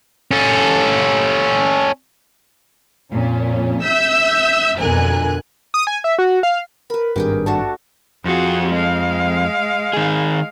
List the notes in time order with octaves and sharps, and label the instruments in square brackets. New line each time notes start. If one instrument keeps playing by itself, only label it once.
[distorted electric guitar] C#4 A4
[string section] F2 A#2 C#4
E5 E6 G6 B6
F2 B2 D3 A#4 G#5 F#6
[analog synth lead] D#6
G#5
E5
F#4
F5
[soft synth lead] A#4 [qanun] B4 B5
[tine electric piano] G#1 G2 [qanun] G4 G#4 G5 [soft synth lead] A#4
[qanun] A3 D4 F#4 [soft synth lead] A5
[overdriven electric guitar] F2 F4 [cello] F#4 G#4
[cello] G#3 F5
[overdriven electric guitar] D#3 G#4